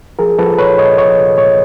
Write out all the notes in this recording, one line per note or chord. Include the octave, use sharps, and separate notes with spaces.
F3 G#4 A#4
F3 A4 B4
A#2 B4 C#5
A#2 C#5 D#5
F3 C#5 D#5
C2
A#2 C#5 D#5